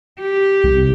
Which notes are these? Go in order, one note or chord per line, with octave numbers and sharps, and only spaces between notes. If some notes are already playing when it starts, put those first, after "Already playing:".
G4
C2